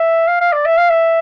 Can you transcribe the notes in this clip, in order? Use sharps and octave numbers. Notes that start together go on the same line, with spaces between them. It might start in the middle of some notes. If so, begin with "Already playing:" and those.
Already playing: E5
F5
F5
D5
E5
F5
E5